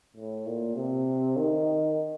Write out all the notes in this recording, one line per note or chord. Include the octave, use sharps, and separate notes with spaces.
A2
A#2
C3
D#3